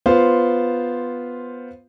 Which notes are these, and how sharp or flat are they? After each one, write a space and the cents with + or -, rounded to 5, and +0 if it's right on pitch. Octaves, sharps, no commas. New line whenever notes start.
B3 +0 F4 +0 C5 +0